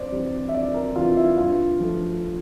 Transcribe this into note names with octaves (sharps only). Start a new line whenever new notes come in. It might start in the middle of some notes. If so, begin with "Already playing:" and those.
Already playing: F2 C5 D5
C3 E3 G3
E5
F2 D5
A#4
C3 E3 G3 F4
E4
G2 F4
F3 A3